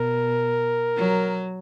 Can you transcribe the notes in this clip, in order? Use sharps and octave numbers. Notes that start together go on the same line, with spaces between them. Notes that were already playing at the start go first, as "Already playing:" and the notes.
Already playing: B2 A#4
F#3